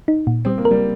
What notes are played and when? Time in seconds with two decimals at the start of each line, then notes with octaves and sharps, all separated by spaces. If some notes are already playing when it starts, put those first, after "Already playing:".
0.08 D#4
0.27 A#2
0.45 G3 C4
0.58 A#3
0.65 A#4
0.71 G3